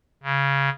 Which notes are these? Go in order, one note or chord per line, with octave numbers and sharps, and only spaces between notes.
C#3